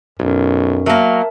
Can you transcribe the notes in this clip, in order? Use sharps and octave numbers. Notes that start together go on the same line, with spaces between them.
B1 F#2
F#3 A#3 A#4 E5 A5